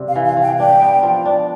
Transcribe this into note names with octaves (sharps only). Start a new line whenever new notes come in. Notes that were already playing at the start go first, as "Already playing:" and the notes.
Already playing: C3 G3
F5
E3
F5
E3
G5
D4 G5
B3
F3
D4